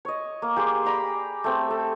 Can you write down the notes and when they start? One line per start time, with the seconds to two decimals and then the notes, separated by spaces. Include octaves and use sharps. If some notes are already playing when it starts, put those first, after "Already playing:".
0.05 C#5 D#5
0.42 A#3
0.56 G4 G#4 C6 D6
0.85 D5 A#5 B5
1.44 A3 C4
1.70 A4